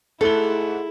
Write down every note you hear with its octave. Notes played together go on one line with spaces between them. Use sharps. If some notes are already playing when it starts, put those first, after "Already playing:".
G#2 A3 E4 A4 G7